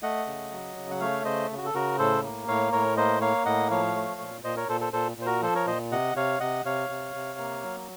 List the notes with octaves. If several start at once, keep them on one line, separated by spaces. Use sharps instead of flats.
A3 D#5 F#5
C#3
F#3
C#3
F#5
A3 C#5 F5
C#3 C5 D#5
C#3
F#4
A4
C#3 F#4 A#4
A2 A4 C5
A#3
A2 C#5 F5
A2 A#4 C#5
A#3 C5 D#5
A#3 C#5 F5
A2 D#5 F#5
F3 C#5 F5
A3
A#2
A#2 C5 D#5
A#4 C#5
A#2 A4 C5
A4 C5
A#2 A4 C5
A#2 C5
F#4 A#4
F3 A4 C5
A#4 C#5
A#2 C5 D#5
C3 D#5 F#5
C3 C#5 F5
C3 D#5 F#5
C3 C#5 F5
C3
C3
A#3
F#3